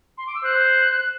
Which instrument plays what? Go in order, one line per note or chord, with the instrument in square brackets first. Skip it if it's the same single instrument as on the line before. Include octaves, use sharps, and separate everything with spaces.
[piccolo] C6
D6
E6
[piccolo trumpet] C5 [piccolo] F#6